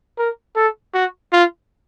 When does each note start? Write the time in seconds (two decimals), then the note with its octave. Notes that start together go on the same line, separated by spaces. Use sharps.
0.18 A#4
0.56 A4
0.94 F#4
1.32 F4